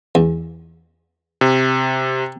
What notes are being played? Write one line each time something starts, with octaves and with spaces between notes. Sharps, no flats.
E2
C3